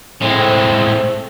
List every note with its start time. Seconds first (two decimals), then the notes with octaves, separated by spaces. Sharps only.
0.22 A2 G#3 A3 C4